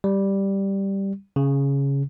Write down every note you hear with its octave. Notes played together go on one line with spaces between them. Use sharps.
G3
C#3